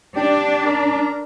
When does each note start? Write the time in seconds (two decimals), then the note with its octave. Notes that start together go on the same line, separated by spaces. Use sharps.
0.16 D4 G4 D5
0.65 A#4